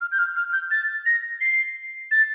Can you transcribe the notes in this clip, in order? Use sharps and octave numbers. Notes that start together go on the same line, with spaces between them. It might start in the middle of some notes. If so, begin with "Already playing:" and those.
F6
G6
F6
F6
G6
A6
A#6
C7
A6